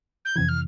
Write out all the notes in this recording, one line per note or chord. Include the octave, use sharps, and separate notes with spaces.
G6
F2 C3 E3 G#6
F6